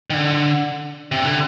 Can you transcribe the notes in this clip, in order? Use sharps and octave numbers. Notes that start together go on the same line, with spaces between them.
D#3
D3
C3
D3